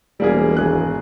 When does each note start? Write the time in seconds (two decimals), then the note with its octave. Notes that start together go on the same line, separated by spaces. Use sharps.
0.20 E1 G3 A#3 G#4
0.57 G#1 G#4 F#6